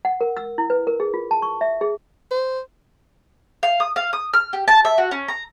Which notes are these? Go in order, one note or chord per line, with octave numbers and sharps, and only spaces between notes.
F#5
A#4
E6
E4
B4
A#4
G#4
F4
A5
C#6
E5
G#4
C5
F5
D#6
F5
D#6
F6
G4
A5
E5
F#4
C#4
A#5